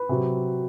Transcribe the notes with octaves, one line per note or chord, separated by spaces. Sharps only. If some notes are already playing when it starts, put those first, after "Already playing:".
Already playing: B4
C3 F#3